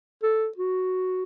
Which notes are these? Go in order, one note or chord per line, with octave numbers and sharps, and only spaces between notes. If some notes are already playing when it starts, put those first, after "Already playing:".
A4
F#4